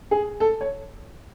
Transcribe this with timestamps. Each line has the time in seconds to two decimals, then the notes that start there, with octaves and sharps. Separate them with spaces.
0.11 G#4
0.40 A4
0.61 C#5